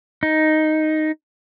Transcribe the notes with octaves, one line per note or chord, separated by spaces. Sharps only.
D#4